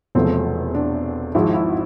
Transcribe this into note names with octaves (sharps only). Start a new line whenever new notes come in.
E1 E2 C3 F3 A3 C4
D4
G#1 G#2 F3 G#3 E4
E4